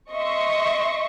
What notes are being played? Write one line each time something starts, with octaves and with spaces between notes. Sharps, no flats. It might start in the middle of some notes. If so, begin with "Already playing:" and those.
D#5 E5 C6 C#6